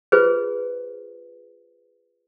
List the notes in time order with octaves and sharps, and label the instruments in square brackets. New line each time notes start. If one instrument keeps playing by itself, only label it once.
[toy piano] F4 G#4 B4 C5